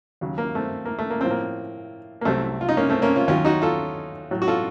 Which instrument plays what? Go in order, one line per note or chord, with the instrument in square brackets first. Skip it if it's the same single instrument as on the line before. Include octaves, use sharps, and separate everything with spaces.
[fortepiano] D#2 C#3 F#3
A#3
A3 C4
A#3
A3
A#3
A2 F3 C4
A#3
A#3
C2 C3 F#3 A3 C4
F4
D#4
A#3 C#4
A3 C4
A#3 C#4
C#4 F4
D#2 D#3 F#3 C#4 F4
D#4 F#4
F4 A4
A2 F#3
F#4
F4 A4